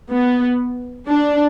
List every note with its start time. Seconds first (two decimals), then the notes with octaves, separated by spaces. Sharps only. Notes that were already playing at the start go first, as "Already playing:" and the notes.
0.10 B3
1.06 D4